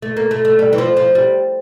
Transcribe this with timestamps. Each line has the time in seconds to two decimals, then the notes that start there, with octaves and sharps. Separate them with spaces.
0.02 A3
0.17 A#3
0.31 A3
0.45 A3
0.59 G3
0.73 E3
0.78 F3
0.97 F3
1.15 G3